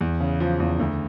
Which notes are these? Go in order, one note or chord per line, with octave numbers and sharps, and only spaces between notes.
E2
C#3
F3
E2
D2